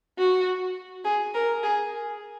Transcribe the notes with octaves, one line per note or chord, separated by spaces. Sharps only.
F#4
G#4
A#4
G#4